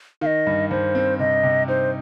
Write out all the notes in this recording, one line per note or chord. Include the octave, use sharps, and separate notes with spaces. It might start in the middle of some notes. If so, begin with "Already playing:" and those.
D#3 D#5 F5
G2
G2 C5
C4
C3 D#5
C3
D#4 C5